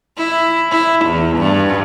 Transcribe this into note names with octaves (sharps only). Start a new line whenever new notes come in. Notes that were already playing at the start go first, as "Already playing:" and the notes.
E4
E4
E2
G2